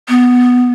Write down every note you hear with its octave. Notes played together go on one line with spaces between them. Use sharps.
B3